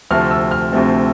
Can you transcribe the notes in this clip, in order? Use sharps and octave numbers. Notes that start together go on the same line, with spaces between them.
D2 C3 F3 A3 C4 F6
E6
F6
D2 C3 F3 A3 C4